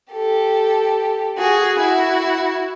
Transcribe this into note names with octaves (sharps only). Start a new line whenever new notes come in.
G4 A4
F#4 G#4
E4 F#4